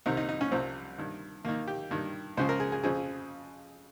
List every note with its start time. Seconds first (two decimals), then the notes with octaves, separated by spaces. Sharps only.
0.06 C2 C3 D#3 D#4
0.17 D#4
0.29 D#4
0.41 C#4
0.52 C2 C3 F3 C4
0.98 G2 D#3
1.45 D#2 D#3 A#3
1.68 G4
1.91 G2 D#3
2.37 C#2 C#3 F3 C5
2.49 A#4
2.60 G#4
2.72 G#4
2.84 F2 C#3 F3 G#4